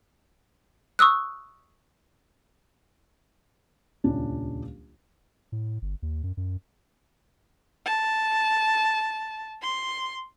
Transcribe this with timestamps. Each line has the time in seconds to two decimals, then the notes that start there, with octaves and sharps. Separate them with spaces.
0.99 C#6 D#6 E6 F#6
4.04 D#1 C#2 C#4 D4
5.52 A2
5.82 G1
6.02 D#2
6.23 F#2
6.37 F#2
7.86 A5
9.62 C6